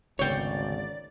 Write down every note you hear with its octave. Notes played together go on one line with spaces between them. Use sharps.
G#1 D2 C#3 B3 C#5 D5 G5